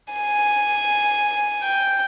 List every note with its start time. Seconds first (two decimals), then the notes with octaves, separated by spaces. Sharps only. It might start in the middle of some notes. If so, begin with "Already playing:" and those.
0.13 G#5
1.63 G5